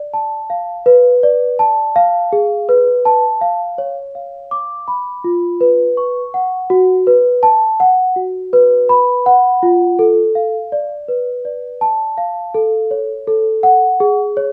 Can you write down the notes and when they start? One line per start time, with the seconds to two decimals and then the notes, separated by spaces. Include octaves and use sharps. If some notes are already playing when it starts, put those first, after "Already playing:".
Already playing: D5
0.14 A5
0.50 F5
0.86 B4
1.23 D5
1.59 A5
1.96 F5
2.33 G#4
2.69 B4
3.05 A5
3.41 F5
3.78 C#5
4.15 F5
4.51 D6
4.88 B5
5.24 F4
5.61 B4
5.97 C#6
6.34 F#5
6.70 F#4
7.07 B4
7.43 A5
7.80 F#5
8.16 F#4
8.53 B4
8.89 B5
9.26 F#5
9.63 F4
9.99 A4
10.35 F5
10.72 D5
11.08 B4
11.45 D5
11.81 A5
12.18 F5
12.54 A4
12.91 C#5
13.27 A4
13.63 F#5
14.00 G#4
14.37 C#5